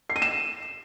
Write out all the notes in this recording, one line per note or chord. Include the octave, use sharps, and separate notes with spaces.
C7
D#7
E7